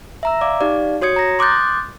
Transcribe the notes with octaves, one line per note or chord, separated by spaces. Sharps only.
E5 A#5 E6
D5 F5 D6
D#4 G4 D5 F5
F#4 C#5 D#6 G#6 C#7
A#5 A#6
C6 D6 D#6 F#6 G6 A6